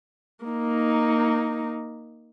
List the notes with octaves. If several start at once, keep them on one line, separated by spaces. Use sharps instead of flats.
A#3 D#4